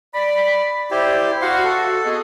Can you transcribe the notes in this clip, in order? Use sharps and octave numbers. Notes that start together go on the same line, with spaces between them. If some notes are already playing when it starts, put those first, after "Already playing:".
D5 B5
E4 G4 C5 D5
F#4 F5 F#5 C6
A4
B3 G#4 D#5